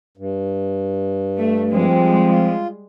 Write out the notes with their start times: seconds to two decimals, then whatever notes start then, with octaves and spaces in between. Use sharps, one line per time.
0.17 G2
1.38 A3
1.73 F3 G3 G#3 C4
2.29 F4